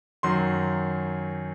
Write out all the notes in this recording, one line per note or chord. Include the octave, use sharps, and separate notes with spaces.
F#2 D#3 F#3 C6